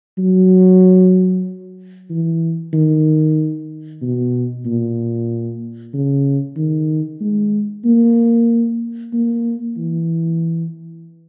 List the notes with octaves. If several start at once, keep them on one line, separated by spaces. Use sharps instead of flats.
F#3
E3
D#3
B2
A#2
C#3
D#3
G#3
A#3
A#3
E3